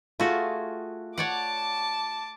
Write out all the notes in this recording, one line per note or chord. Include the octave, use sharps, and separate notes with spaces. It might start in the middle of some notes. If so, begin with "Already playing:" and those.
A3 F4 F#4 G#4
C#5 D5 F#5 A5 D6